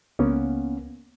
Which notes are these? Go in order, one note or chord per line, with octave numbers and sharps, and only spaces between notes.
C#2 A#3 B3 C#4